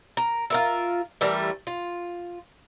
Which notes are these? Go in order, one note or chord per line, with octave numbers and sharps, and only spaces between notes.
A#4
F4 A#4 E5
E3 G3 A3 A#4
F4